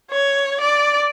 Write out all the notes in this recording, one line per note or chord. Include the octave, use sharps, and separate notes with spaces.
C#5
D5